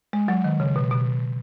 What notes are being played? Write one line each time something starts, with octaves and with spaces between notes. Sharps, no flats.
G#3
F#3
D#3
C#3
B2
B2